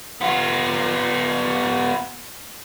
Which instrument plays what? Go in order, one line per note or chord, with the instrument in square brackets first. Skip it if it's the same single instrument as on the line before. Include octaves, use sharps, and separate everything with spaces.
[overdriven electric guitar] B3 F4